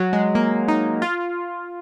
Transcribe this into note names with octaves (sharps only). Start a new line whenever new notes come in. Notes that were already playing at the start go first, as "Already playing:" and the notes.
Already playing: F#3
G#3
A#3
D#4
F4